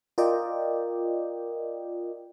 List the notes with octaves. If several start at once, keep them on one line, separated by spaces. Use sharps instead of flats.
F4 A#4 D5 D#5 G5